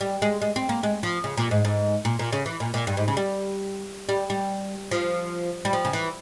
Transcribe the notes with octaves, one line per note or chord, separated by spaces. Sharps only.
G3
G#3
G#3
C4
A#3
G#3
F3
C#3
A#2
G#2
G#2
A#2
A#2
C#3
E3
A#2
A#2
G2
G#2
C#3
G3
G3
G3
F3
G3
F3
C#3
E3